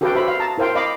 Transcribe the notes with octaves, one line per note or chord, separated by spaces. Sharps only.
F#4 G4 A4 B4 F5 G5
F#4 C5 E5 B5
F5
A5 A#5
E4 A#4 C5 F5 G5
D#5 F5 B5 D6